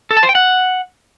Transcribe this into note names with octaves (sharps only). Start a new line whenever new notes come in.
A4
A5
C5
G5
F#5